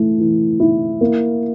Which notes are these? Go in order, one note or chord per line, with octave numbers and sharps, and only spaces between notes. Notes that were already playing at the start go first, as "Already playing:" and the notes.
Already playing: E3 A3
E3
E4
A#3